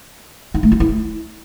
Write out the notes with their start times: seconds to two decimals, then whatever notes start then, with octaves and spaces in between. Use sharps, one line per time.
0.54 D#4
0.63 A3
0.72 F4
0.80 E4